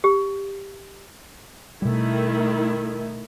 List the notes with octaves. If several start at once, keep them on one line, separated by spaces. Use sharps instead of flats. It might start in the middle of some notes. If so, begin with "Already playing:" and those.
G4
B2 D#3 G3 A3 E4